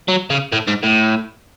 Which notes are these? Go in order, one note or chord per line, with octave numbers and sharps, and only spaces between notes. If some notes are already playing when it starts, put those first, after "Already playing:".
F#3
C#3
A2
G#2
A2